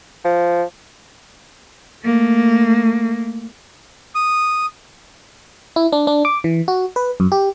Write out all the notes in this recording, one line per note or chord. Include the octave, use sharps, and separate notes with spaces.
F3
A3 A#3
D#6
E4
D4
D4
D6
E3
F#4
B4
F#2
G4